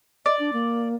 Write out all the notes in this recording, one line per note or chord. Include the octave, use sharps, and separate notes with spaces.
D5 D#5
D4
A#3